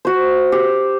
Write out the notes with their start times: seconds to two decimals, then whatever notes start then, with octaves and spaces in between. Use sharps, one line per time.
0.05 F#4 C5
0.52 G4